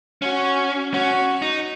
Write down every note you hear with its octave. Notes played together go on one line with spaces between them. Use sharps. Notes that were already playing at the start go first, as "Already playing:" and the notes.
C#4 F#4
C#4 F#4
D#4